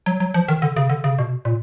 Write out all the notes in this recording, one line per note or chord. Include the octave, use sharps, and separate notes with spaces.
F#3
F#3
F3
D#3
D3
C#3
D3
C#3
B2
A#2